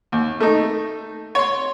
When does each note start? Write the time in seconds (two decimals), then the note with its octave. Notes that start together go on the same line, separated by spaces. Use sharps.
0.12 D#2
0.40 A3 D#4
1.35 C#5 C6